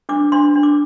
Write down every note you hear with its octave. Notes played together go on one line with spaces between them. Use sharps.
D4 D6
D4 C6
D4
D6